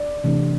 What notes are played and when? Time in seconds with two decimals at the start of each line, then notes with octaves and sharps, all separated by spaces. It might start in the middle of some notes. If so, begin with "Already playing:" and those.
Already playing: D5
0.24 C3 E3 A3 D4